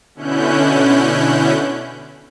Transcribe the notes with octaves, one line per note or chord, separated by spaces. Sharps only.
B2 D3 C#4 E4 F#6 G6